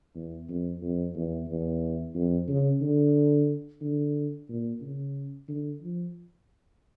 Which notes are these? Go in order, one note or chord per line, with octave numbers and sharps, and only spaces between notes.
E2
F2
F2
E2
E2
F2
C#3
D3
D3
A#2
C#3
D3
F3